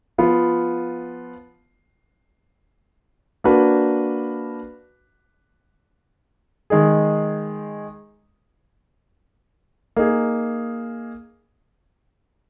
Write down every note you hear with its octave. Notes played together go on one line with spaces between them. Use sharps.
F3 B3 F4
A#3 D4 F#4 B4
D#3 G#3 D#4 G#4
A#3 D#4 G#4